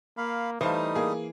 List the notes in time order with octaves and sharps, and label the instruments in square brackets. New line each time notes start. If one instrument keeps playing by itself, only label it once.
[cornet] A#3 [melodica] F5 B5
[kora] E3 [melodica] G3 A3 D#6 [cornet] D#4 [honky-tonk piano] C5 F5 A5
[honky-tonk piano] A#3 G#4